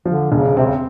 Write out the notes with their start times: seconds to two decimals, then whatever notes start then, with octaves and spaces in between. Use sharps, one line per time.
0.05 D3 F3
0.32 E1 C#3
0.57 C3 C4
0.66 C#3